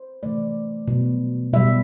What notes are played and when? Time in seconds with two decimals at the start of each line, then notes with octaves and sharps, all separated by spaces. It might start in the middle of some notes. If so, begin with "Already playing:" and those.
Already playing: C5
0.23 C3 E3 A3 D5
0.88 B2 G3
1.53 B2 G3 E5